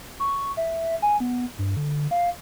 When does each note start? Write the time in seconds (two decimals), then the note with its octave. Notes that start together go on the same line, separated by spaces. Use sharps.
0.20 C#6
0.57 E5
1.02 G#5
1.20 B3
1.58 G2
1.77 D3
2.11 F5